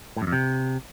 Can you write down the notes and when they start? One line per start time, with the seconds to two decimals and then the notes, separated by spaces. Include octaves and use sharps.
0.17 A2
0.22 F#2
0.27 F2
0.32 C3